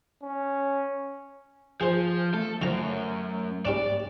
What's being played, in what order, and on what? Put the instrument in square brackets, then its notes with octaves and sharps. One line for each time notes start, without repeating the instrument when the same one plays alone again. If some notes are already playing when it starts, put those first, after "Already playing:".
[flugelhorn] C#4
[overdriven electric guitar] F3 [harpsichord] G#4 C5
[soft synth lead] A3 [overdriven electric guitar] A4
[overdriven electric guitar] F#2 [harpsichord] D3 F3 A#5
[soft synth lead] G#2 [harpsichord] G3 C#4 D4 [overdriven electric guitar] D5